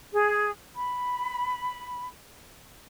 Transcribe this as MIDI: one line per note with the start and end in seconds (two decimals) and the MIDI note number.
0.12 0.51 68
0.75 2.07 83